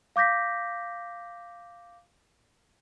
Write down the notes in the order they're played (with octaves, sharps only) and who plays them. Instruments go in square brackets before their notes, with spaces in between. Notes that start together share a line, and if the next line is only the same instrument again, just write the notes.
[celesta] F5 D6 G6 A#6 B6